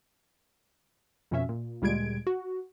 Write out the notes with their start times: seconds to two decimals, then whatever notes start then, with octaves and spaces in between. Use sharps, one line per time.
1.31 F2 B2 C#4 E5
1.49 A#2
1.82 D2 A#2 G3 G#3 G#6 D7
2.27 F#4